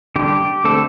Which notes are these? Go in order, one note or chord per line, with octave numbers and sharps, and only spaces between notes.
D3 G3 D4 G4
D3 A3 C4 A4